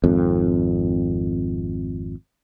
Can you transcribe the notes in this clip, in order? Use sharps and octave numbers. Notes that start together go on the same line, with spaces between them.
G#1 F2